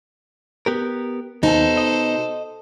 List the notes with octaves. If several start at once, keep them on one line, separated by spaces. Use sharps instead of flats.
B3 G4 A#4
D#2 B2 D#4 A4 C5
D#5